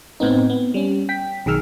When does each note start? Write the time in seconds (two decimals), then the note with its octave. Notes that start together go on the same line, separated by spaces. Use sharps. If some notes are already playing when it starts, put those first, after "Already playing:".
0.20 A2 B3 C4 D#4
0.50 B3
0.74 G3 C#4
1.09 G5 B6
1.46 B1 D#3 G#4 E6 F6